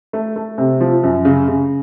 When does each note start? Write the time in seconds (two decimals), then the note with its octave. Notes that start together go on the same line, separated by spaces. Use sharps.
0.13 A3
0.36 A3
0.58 C3
0.80 F3
1.03 F#2
1.25 C#3
1.48 C#3